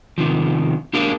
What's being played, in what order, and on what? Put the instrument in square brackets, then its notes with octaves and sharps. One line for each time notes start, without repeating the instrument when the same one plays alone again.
[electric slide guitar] C3 D#3 F3
A#3 D4 G4 A#4 F5